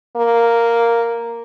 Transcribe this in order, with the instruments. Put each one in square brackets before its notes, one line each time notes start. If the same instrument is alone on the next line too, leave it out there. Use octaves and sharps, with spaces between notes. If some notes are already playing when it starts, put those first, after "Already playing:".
[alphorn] A#3